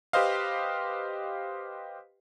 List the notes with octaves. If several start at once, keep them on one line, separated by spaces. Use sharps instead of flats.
G4 B4 C5 D#5 F5